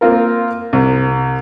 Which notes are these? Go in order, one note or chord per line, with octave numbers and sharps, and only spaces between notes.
A#3 C4 F4 A#4
C2